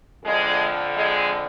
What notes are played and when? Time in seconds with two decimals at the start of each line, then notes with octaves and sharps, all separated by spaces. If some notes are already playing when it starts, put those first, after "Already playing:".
0.24 F2 D3 G#3
0.96 G#3